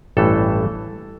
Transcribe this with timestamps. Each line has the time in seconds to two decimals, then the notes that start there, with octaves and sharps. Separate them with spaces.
0.17 A1 G2 E3 A3 A4